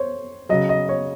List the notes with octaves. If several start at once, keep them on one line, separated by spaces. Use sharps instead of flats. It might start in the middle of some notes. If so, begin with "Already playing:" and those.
Already playing: C5 C#5
C#3 F#3 D#5
D#5
C#5